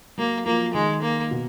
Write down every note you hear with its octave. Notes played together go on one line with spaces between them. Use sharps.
F#3 A#3
F3 A#3
D#3 G#3
A#3
B2